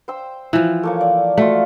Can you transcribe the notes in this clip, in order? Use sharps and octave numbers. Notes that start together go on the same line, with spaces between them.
C5 G5 E6
E3 F3
A3 A#3 C#5
D5
A3 F4 F#4